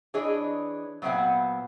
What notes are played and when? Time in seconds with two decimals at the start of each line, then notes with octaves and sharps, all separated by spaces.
0.14 E3 D4 G#4 C#5 D#5
1.02 A#2 F#3 B3 C4 E5 F#5